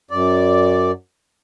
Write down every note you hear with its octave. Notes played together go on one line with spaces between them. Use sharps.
F#2 D5